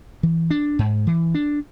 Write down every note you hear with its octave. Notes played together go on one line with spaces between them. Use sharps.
E3
D4
G#2
E3
D4